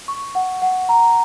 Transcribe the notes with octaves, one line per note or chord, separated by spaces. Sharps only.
C#6
F#5
F#5
A#5